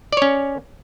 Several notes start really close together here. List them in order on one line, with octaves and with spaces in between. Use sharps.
D5 C#5 C#4